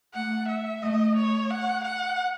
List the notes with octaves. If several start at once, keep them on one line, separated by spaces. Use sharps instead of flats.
A3 F#5
E5
A3 D#5
C#5
F#5
F#5